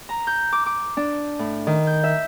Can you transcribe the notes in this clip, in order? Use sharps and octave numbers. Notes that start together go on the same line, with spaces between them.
A#5
G6
D6
D6
D4
A2
D#3
G6
E5